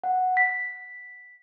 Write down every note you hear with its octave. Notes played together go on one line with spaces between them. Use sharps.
F#5
B6